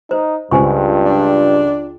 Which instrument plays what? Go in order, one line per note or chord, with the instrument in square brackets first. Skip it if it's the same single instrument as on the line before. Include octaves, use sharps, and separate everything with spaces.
[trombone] D#4 [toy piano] C5
[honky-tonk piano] C#2 [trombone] G2 [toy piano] C5 G#5 C#6
[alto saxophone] D4